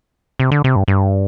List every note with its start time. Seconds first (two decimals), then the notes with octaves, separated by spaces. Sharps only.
0.40 C3
0.51 D3
0.64 C3
0.76 G2
0.88 G2